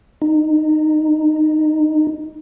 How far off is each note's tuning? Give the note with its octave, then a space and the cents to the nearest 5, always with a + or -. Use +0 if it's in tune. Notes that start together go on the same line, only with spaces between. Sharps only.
D#4 -15